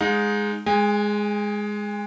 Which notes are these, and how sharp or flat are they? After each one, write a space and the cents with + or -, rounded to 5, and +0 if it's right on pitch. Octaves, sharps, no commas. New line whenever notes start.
G#3 +0 D#4 +0 F5 +45
G#3 +0 G#5 -35